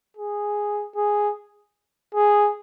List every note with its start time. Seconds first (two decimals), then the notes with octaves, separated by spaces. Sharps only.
0.17 G#4
0.96 G#4
2.15 G#4